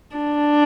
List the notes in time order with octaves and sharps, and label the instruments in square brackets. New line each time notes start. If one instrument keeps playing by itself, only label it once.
[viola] D4